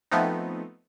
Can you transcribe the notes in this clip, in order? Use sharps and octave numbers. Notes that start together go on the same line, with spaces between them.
F3 A3 B3 C4 D#4